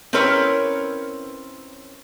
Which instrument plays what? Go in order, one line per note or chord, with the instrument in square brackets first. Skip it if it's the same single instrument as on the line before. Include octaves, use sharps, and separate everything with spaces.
[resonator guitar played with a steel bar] C4 C#4 E4 A#4 B4 C#5